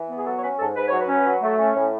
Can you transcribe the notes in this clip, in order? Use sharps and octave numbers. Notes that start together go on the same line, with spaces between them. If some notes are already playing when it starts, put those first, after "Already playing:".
Already playing: E3
B3
G#4
F#3 A4
C#5
C#4 B4
G#2 A4
G#2 B4
F#3 C#5
B4
C#4
F#3
A3
C#4
A2